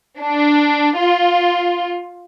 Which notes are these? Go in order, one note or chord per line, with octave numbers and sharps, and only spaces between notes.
D4
F4